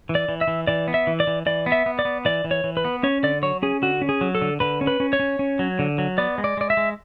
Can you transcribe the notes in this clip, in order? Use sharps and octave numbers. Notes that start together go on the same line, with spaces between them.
E3
D5
E3
E5
E3
E3 D5
B3
E5
E3
D5
E3
E3 D5
B3
E5
B3
D5
B3
E3 D5
E3
C#5
E3
B4
B3
C#4 C#5
D3 D5
F#3 C#5
C#4 G#4
D3 F#4
C#4
G#4
F#3
A4
D3
D3 B4
C#4
B4
C#4
C#5
C#4
C#4
F#3
D3
F#3
B3 D5
G#3
D5
G#3 D5
E5
G#3